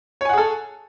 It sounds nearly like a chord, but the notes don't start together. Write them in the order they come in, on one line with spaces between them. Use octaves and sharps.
C#5 G#5 F#5 G#4 A4